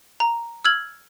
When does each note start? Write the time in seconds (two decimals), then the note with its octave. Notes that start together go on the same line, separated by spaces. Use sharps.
0.20 A#5
0.65 E6 F6 G#6 F#7